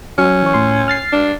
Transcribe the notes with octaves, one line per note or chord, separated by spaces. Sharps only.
F#3 C#4
E3 C#5
A2 C6
F6 A6 C7
D4